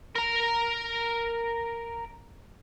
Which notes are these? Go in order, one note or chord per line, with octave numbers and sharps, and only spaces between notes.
A#4 A#5